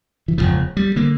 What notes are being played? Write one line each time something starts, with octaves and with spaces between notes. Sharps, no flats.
E3
E1 D2 C#3 F3
G3
D3 A#3